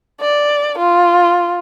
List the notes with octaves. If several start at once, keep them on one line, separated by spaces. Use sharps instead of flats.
D5
F4